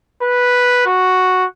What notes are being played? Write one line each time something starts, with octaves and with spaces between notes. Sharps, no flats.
B4
F#4